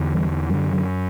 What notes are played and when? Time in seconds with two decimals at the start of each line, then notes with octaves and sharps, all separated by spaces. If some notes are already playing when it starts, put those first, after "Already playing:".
Already playing: E2 D3
0.14 E3 G3
0.49 F#2 D3 E3 G3
0.73 D3 F#3